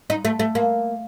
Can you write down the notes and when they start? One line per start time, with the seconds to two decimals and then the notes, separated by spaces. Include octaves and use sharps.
0.10 D#4
0.25 A3
0.39 A3
0.55 A#3